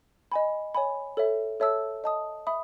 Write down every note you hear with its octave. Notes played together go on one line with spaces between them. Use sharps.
D#5 G#5 B5
C#5 G#5 B5
A4 C#5 E5
A4 C#5 E5 A5 E6
D#5 A5 D#6
E5 B5 D#6